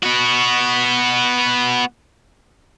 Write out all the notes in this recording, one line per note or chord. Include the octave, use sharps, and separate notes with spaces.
B3 F#4